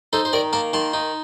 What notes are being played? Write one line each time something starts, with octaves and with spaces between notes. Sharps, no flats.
D#4 A4 C5
C5
D#3 A#4 D5
A#3 F5 A5
D#3 A5 C6
D#4